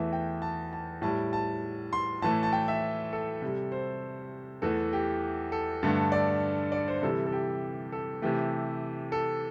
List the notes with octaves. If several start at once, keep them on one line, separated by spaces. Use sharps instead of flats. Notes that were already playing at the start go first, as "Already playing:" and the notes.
Already playing: E2 E3 A3 E5
G5
A5
A5
A2 G3 A5
A5
C6
A2 E3 A3 A5
A5
G5
E5
A4
C3 G3
C5
E2 E3 A3 A4
G4
A4
G2 D3 A3
D5
D5
C5
C3 E3 G3 A4
A4
G4
A4
C3 E3 A3 G4
A4